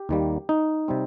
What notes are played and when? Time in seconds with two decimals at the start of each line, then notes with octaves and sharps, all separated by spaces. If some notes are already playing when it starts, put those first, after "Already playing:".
Already playing: G4
0.09 D#2 D#3 G3 A#3
0.49 D#4
0.88 C3 G3 C4